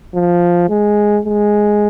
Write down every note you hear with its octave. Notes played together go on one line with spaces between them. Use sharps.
F3
G#3
G#3